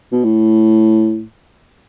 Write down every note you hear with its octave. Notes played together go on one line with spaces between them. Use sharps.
B2
A2